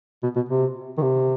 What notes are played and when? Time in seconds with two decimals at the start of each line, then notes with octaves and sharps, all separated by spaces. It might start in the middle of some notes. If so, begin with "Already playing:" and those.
0.23 B2
0.36 B2
0.49 C3
0.98 D#3
1.02 C3